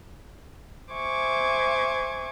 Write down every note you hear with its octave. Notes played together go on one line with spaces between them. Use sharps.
C5 E5 G#5 C#6 D6 G#6